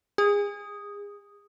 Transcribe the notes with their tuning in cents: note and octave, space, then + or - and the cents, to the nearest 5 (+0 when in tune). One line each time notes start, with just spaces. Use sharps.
G#4 -30 D#6 +0